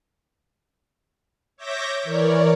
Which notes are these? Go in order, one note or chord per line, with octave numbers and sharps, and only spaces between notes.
C#5 E5 D6 G6 A#6
E3 A#4 C#5 D5